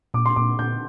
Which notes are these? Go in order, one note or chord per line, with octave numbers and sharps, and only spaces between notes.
A#2 D6
C6
A#2 D6
A#2 G6